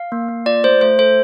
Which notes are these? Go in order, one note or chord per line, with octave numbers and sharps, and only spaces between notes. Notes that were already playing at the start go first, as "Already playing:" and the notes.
Already playing: F5
A#3
A#3
F4 D5
A3 C5
A3 C5
A4 C5